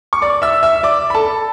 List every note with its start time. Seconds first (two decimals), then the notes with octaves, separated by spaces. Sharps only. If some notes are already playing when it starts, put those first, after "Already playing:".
0.13 C#6
0.22 D5 D6
0.42 E5 E6
0.63 E5 E6
0.83 D5 D6
1.10 B5
1.14 A4 A5